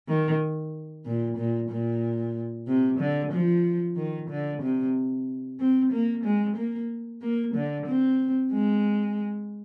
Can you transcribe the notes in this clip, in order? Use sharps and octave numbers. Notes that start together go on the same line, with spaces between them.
D#3
A#2
A#2
A#2
C3
D3
F3
D#3
D3
C3
C4
A#3
G#3
A#3
A#3
D3
C4
G#3